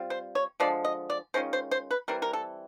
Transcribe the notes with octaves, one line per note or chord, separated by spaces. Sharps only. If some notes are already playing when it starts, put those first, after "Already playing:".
Already playing: G3 C4 F4
C5
C#5
D3 F3 G#3 D5
D#5
D5
D#3 G#3 C#4 F4 C5
C5
C5
B4
E3 G3 C4 A#4
A#4
A4